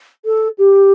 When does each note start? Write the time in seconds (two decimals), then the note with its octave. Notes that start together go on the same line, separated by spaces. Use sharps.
0.25 A4
0.58 G4